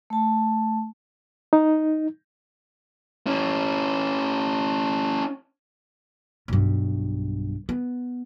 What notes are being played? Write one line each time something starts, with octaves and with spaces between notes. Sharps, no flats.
A3 A5
D#4
C#4 E4
B1 G2
B3